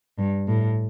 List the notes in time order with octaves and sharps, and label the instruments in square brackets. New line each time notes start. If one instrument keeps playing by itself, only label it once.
[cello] G2
A2